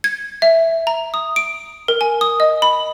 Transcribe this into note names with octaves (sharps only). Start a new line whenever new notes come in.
G#6
E5
A#5
D#6
D7
A#4
G#5
D#6
D#5
B5